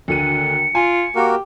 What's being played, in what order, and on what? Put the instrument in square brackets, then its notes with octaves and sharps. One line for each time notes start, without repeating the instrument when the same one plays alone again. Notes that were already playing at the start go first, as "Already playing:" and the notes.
[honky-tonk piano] D2 D3 D#7 [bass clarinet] D#3 [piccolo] C#7
[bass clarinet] F4 [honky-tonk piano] G#5
[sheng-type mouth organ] A#3 F#4 A#4 [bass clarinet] G4